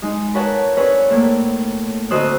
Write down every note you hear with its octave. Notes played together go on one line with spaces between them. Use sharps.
G#3 D#4
A#4 B4 C#5 F#5 A5
C4 D4 G#4 B4 C#5 F#5
A2 A#3
D2 C4 C5 D#5 D#6 F#6